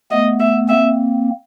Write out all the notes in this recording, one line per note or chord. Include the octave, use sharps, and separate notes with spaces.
A3 B3 D#5
E5
A#3 C4 E5